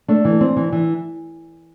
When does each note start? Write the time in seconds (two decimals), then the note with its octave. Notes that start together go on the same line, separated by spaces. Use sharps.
0.08 A3 D4
0.25 E3
0.41 C4
0.56 E3
0.72 E3